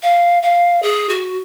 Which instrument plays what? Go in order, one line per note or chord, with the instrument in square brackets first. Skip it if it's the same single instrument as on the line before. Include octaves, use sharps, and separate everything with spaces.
[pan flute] F5
F5
G#4
F#4